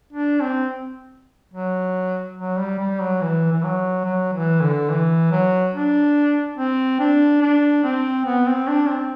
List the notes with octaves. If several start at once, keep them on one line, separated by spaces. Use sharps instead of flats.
D4
C4
F#3
F#3
G3
G3
F#3
E3
E3
F#3
F#3
E3
D3
E3
F#3
D4
C4
D4
D4
C4
B3
C4
D4
C4